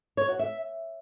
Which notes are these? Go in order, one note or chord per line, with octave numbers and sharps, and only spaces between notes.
C#5
F#4
E5